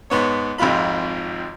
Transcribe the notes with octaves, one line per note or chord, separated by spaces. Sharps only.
G#2 B3 C#5
G#1 F2 G#2 F4 B5